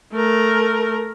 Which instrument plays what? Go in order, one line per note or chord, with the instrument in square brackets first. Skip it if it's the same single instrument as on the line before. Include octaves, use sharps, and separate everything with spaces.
[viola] A3 A#4